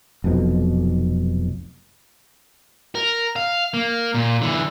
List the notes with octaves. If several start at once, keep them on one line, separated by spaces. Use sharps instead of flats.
F1 B1 F2 B2
A#4
F5
A#3
A#2
D3 E3